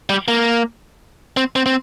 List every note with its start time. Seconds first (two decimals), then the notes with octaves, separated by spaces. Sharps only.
0.10 G3
0.28 A#3
1.37 C4
1.56 C4
1.66 C4